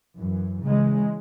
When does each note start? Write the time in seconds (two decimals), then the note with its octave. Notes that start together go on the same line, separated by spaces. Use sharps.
0.18 F#2 E3
0.64 C#3 E3 G#3